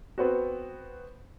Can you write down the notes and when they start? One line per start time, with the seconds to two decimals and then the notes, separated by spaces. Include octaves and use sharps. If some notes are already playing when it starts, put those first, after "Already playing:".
0.18 B3 C4 F#4